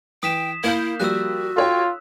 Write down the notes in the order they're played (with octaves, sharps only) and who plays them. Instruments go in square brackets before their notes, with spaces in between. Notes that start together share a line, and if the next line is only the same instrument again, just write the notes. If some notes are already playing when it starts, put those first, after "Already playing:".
[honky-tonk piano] E3 [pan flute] G5 [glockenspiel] D#6 B6 E7
[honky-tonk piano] A#3 F5 G6 [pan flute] E4
[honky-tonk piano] F3 G3 A#3 [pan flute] F#4 [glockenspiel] E6 F#6
[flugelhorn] F4 [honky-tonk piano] A4 C#5 G5